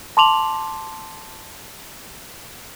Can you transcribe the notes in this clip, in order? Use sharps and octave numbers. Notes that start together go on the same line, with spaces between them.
A5 C6 D6 F7 F#7